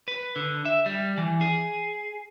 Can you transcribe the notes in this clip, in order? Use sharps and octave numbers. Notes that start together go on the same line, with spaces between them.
B4
D3
E5
G3
E3
G#4